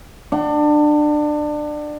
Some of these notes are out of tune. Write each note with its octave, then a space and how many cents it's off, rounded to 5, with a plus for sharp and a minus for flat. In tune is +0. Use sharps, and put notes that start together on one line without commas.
D4 +25 F#5 +40